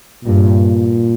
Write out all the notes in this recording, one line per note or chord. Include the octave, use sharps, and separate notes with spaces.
G2 A#2